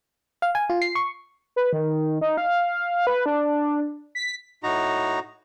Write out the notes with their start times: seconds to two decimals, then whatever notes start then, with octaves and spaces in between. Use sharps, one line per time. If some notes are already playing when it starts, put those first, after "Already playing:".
0.42 F5
0.55 G#5
0.70 F4
0.82 C7
0.95 C#6
1.56 B4
1.73 D#3
2.21 D#4
2.37 F5
3.07 B4
3.26 D4
4.15 B6
4.63 A2 D#4 F#4 A#5